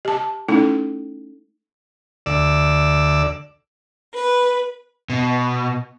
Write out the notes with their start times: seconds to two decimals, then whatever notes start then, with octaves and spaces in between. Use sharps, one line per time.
0.05 G4 A5
0.48 A3 C#4 D#4 E4 A4
2.26 D2 D5 E6
4.14 B4
5.09 B2